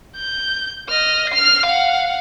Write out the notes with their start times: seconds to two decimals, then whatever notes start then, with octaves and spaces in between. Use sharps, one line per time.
0.16 G6
0.90 D#5 F6
1.29 F6 C7
1.65 F5 F#5